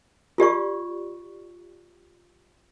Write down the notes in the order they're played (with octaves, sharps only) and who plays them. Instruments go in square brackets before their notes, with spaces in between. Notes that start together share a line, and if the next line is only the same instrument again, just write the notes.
[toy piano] F4 G4 D5 C#6